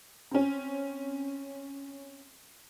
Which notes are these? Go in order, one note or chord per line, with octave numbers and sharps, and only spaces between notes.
C4 C#4